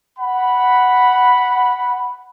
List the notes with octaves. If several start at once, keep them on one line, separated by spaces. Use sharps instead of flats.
F#5 B5